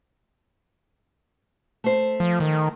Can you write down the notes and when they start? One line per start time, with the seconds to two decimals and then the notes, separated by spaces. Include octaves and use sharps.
1.84 A3 C5
2.20 F3
2.40 D#3